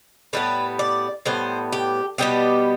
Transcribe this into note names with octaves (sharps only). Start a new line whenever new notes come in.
A2 G3 B3 B4
D5
A2 G3 B3 C5
G4
B2 G3 B3 G4